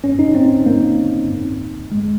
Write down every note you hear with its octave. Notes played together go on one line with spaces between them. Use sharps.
C#4
D#4
C4
A#3
G#3